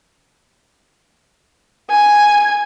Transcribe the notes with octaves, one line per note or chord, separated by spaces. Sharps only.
G#5